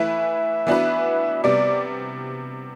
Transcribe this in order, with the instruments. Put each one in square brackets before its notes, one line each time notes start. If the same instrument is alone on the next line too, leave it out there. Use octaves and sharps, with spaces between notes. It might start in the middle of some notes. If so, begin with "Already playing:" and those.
Already playing: [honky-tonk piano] E3 A3 E4 B4 [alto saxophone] E5
[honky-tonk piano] E3 B3 D4 F#4 B4
[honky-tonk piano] C3 G3 B3 [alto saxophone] D5